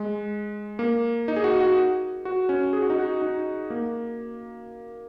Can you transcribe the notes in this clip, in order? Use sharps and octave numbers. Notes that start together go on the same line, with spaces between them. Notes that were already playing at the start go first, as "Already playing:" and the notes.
Already playing: G#3
A#3
D#4
G#4
F#4
F#4
F#4
C#4
G#4
F#4
D#4
F#4
D#4
A#3